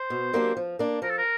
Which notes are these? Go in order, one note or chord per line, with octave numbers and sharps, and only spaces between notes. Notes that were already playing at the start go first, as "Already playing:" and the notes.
Already playing: C5
B2
F#3 A#3 D4 G4
F3
A#3 D4
F3 A#4
A4
A#4